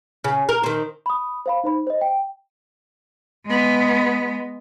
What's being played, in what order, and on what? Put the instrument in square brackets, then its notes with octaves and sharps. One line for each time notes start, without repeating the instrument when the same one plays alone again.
[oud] C#3
A#4
D#3 C4
[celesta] B5 D#6
C5 F5 B5
D#4 C5 B5
C5 D#5
G5
[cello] G#3 B3